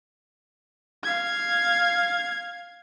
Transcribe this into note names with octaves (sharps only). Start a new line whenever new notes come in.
F5 G#6